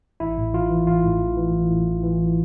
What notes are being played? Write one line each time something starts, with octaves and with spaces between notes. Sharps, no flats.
A1 E4
A2
A1 F4
E3
A1 F4
A2
A1
E3
A1
A2
A1
E3